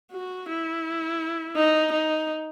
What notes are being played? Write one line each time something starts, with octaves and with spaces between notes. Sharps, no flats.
F#4
E4
D#4
D#4